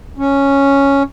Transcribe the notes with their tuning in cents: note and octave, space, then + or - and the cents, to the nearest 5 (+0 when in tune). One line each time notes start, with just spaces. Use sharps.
C#4 +0